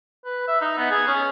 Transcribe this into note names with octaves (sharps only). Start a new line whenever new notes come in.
B4
E5
D#4
B3
G#4
C#4